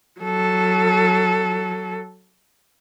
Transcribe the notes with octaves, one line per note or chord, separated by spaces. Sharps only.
F#3 A4